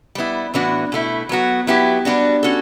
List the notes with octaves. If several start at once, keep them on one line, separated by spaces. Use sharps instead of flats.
G3 B3 E4
A2 E3 B3 D4 F#4
B2 A3 E4
F#3 B3 F#4
F#3 B3 E4 G4
G3 B3 D4 F#4
C#4 F#4 A4